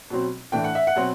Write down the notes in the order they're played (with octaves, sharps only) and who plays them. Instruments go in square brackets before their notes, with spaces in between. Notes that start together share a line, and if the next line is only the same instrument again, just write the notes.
[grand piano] B2 F#3 C4
A2 E3 A3 D4 G5
F#5
E5
F#5
B2 F#3 C4